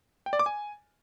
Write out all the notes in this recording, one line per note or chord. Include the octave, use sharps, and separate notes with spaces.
G5
D5
D6
G#5